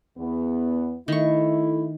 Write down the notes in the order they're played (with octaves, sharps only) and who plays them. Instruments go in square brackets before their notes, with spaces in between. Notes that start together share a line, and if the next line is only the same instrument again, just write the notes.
[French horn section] E2 B3
[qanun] D#3 C#6 [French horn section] A3 E4